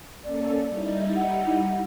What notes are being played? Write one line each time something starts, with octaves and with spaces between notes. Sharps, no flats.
A#3 C#4 A4 D5
G3 D#4 E4
F#5